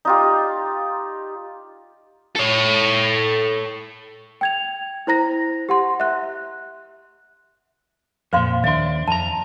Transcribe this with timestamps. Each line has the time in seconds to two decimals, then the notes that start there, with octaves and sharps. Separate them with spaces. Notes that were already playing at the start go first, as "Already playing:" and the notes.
0.05 D#4 F4 G4
2.36 A4 C#5
4.41 G5 G#6 F7
5.07 E4 C5 A#5 A#6
5.69 G4 F#5 C6
6.00 E5 F#6
8.33 F2 A#2 C5 F5 C6
8.64 D#2 D4 E5 C6
9.08 F2 A5 A#5